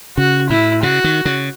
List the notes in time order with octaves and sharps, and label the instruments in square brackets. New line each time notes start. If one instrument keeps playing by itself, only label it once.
[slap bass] C#3 [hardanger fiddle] F#4
[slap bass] A2 [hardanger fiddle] E4
[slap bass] C#3 [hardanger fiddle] F#4
[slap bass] D#3
C#3